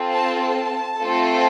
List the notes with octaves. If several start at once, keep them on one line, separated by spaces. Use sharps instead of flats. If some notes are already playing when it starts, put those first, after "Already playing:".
Already playing: C4 F4 A4
A5
A5
A3 C4 F4 A4